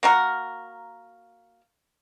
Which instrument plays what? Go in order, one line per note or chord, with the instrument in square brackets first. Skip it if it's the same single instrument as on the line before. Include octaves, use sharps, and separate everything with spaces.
[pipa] A#3 F#4 A#4